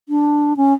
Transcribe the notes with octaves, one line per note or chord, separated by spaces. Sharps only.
D4
C#4